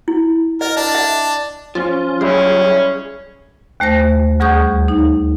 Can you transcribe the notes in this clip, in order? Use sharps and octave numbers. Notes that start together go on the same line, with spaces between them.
E4
A#4 D#5
D4 D#5 A5
E5
F3 C#4 F4
F#2 G3 C#4 E4 G#4
D#2 A3 C5 A#6
D2 G3 G#4 C#6 D#6 G6
D#4